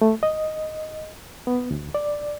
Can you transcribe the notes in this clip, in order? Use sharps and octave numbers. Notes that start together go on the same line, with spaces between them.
A3
D#5
B3
D2
D5